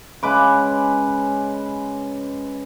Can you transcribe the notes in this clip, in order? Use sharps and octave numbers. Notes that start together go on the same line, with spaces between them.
C#3 G#3 B4 D6